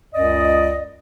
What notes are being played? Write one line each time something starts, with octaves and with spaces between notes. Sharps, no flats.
C#2 F#2 D5 D#5